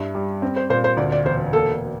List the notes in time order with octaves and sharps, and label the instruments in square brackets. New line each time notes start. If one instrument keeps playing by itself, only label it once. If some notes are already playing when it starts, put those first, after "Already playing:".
Already playing: [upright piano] G2 E4
G3
C4
[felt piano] C5
[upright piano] A#2 [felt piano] C5
[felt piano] C5
[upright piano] D2 [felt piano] D5
[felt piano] D5
[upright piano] E1 [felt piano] C5
[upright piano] A#3 [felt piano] A4